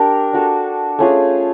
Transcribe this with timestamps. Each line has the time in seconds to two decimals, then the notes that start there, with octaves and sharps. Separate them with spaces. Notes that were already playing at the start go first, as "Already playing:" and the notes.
Already playing: D4 G4 A#4
0.33 D4 F#4 A4
0.99 A3 C#4 F4 G#4